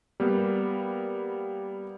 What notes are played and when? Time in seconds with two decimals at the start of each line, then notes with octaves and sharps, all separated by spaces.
0.20 G3 A#3 B3